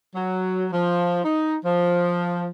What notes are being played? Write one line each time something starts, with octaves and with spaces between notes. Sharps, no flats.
F#3
F3
D#4
F3